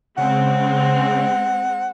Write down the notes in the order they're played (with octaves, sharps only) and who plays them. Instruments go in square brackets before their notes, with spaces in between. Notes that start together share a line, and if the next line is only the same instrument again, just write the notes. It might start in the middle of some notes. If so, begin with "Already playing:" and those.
[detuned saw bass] C#3 [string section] G#3 C4 [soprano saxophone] F#5